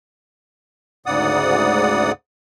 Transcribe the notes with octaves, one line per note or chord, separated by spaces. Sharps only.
D2 G#2 C#3 D5 F#5 D#6